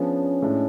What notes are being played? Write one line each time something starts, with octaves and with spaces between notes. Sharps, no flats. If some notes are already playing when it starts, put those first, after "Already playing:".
Already playing: F3 B3 C#4 D4 G#4
A2 G#3 D4